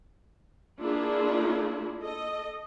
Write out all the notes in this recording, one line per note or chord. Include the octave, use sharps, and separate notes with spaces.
A#3 D4 E4 F4 G#4
A4 D#5